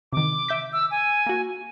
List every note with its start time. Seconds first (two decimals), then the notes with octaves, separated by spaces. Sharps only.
0.13 C3 D#3 D6
0.48 E5 G6 B6
0.73 E6
0.91 G#5
1.26 A#3 F#4